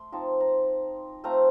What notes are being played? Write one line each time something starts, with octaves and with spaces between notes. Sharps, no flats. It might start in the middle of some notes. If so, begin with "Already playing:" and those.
Already playing: A3 C6
F3 C4 D#4 A5
A#5
A3 C4 F4 A#5